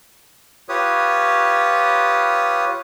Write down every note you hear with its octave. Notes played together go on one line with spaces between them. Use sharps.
F4 G4 B4 C#5 D#6